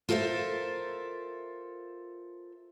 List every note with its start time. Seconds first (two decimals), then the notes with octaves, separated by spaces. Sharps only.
0.09 F4 A4 A#4 C5 E5